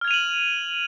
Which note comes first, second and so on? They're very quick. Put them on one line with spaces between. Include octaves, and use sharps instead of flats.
F6 G#6 F7 D#7 F#7